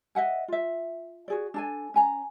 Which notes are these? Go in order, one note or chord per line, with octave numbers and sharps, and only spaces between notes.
D#5 E5 F#5 G#5
F4 E5
F#4 G#4 D5
D4 A4 G#5
C#4 G#5 A#5